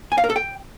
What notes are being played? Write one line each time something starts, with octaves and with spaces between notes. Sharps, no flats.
G#5
F5
A#4
A4
G5